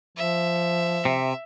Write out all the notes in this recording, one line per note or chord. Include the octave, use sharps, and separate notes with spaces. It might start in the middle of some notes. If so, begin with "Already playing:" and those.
F3 E5
C3